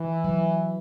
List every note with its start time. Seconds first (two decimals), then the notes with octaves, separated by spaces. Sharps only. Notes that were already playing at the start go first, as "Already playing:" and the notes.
Already playing: E3
0.24 F#3